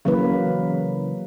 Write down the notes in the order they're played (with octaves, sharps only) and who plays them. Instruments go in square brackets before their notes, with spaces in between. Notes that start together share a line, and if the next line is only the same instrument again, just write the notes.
[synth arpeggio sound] C#3 E3 [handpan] F#3 A#3 B4